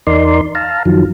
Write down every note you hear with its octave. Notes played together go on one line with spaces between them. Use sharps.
E2 D#4 A#4 D5 C6
F5 A5 A#5
F#2 D#3 F3 F#3